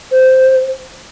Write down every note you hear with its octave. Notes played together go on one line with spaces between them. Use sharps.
C5